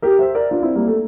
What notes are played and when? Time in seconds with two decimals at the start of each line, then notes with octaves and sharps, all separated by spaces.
0.02 G4 A#4
0.19 C5 E5
0.35 A#4 D5
0.51 D4 F4
0.63 C4 E4
0.75 G3 A#3
0.87 A3